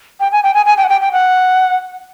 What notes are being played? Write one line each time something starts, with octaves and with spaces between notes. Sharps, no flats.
G5
G#5
G5
G#5
G#5
G5
F#5
G5
G5
F#5